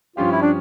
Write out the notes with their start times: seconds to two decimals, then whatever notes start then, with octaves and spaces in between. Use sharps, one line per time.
0.17 G2 F3 C#4 F4 G4
0.32 E4
0.41 D4